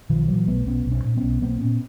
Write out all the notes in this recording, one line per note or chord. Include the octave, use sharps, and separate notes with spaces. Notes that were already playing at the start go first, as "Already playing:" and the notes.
B1 D#3 F3
A#2 E3 F#3
B1 A3 B3
B1 B3 C#4
B1
C4 D4
A#2
B3 C#4
B1
B1 A#3 C4
A#2 B3 C#4